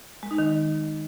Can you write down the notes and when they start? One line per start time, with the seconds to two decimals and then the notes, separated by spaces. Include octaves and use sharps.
0.23 G#3
0.31 D#4
0.38 D#3